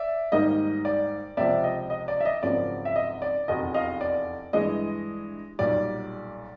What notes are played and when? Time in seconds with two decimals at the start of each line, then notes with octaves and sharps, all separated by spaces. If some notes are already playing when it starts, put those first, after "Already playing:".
Already playing: D5 E5
0.32 G#2 D#3 G3 A#3 D#5
0.85 D5
1.37 C#2 C3 F3 D5 E5
1.64 D#5
1.90 D#5
2.08 D5
2.20 E5
2.25 D#5
2.43 G#1 F#2 C#3 F3 D5
2.85 E5
2.96 D#5
3.22 D5
3.48 F1 E2 B2 D#5
3.74 D#5 F5
4.01 D5
4.53 G2 E3 G#3 D#5
5.59 B1 A#2 G3 D5